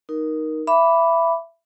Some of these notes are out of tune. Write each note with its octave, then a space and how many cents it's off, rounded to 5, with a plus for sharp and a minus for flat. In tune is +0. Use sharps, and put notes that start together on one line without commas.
D#4 +0 A#4 +10
E5 +20 B5 +0 D6 -10